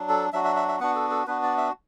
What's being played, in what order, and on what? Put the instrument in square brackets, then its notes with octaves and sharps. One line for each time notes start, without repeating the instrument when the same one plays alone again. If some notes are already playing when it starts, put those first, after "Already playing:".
Already playing: [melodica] F#3 D4
A4
F#3 D4 F#4 E5
E5
E5
E5
B3 D4 F#4 F#5
A4
A4
B3 D4 F#4 B4
D5
E5